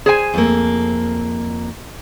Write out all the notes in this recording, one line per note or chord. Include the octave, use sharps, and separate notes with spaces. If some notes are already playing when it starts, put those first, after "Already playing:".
G#4 C5 G#5
F2 A3 A#3